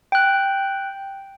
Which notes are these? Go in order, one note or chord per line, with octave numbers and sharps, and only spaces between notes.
G5 F#6